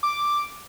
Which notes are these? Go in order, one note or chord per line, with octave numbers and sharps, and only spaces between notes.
D6